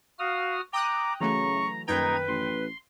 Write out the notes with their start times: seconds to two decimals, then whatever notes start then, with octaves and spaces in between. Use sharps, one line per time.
0.19 F#4 F5 D#6 F6
0.73 G5 A#5 D6 D#6 F#6
1.21 C#3 E3 F#3 A3 A#5 C#6
1.88 D#1 F#2 D#3 D#4 B4 G5 A#5 G#6
2.28 A1 C6